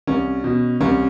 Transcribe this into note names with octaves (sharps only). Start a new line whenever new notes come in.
C2 C#4
B2
C2 C#4